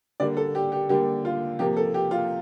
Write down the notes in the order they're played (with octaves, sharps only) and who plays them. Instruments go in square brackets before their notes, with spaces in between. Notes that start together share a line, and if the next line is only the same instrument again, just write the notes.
[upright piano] D3 G3 A#3 D5
A4
G4
G4
D3 G3 A#3 G4
F4
C3 F3 A#3 G4
A4
G4
F4